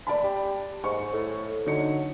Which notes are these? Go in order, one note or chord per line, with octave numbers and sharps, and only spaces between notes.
D5 A5 B5
G4
G#2 C#6
A2
D3 F#3 D#4 C#7